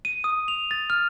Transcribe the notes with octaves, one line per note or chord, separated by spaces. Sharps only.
D#7
D#6
F7
A6
F6